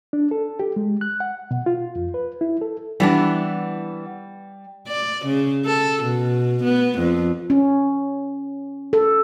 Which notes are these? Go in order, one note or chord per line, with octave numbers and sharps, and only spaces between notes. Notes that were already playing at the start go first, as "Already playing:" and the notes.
D4
A4
G4
G#3
F#6
F#5
B2
F4
F2
B4
E4
A4
E3 G3 B3 D4
D5
C#3
A4
B2
B3
F2
C#4
A4